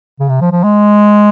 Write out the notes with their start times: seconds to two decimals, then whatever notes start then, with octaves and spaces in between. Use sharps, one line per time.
0.20 C#3
0.29 C3
0.41 F3
0.52 F3
0.64 G#3